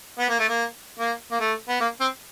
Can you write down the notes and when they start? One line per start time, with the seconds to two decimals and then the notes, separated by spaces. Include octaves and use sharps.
0.19 B3
0.29 A#3
0.40 A3
0.49 A#3
0.99 A#3
1.31 A#3
1.40 A3
1.69 B3
1.81 A#3
2.00 C4